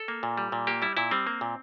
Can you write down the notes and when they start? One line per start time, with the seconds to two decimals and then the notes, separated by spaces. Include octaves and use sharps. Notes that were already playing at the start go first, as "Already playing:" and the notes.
Already playing: A4
0.08 A#3
0.23 A#2
0.38 G3
0.52 A#2
0.67 A#3 G4
0.82 G3 E4
0.97 A#2 E4
1.11 G3 C4
1.27 A#3
1.41 A#2